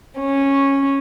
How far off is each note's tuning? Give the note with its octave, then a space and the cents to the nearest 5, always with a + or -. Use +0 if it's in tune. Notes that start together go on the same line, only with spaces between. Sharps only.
C#4 -10